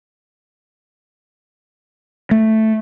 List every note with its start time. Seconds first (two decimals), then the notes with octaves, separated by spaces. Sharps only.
2.31 A3